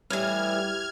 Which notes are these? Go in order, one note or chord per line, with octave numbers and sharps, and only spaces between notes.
A2 E3 G3 F6 G#6